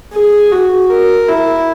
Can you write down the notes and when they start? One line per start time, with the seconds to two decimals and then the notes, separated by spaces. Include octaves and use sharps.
0.14 G#4
0.52 F#4
0.90 A#4
1.29 E4